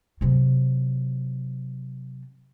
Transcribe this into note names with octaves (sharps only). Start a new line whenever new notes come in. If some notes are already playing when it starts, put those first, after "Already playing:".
C3 F#3